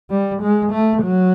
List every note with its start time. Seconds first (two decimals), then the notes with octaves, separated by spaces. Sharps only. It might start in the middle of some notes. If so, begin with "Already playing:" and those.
0.10 G3
0.41 G#3
0.72 A3
1.04 F#3